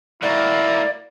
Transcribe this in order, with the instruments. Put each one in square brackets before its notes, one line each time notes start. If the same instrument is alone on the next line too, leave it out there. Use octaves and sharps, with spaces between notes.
[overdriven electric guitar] A#3 F#4 [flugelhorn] E4 [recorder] D5